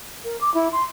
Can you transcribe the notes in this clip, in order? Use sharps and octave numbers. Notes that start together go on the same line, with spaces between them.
A#4
D6
E4
C6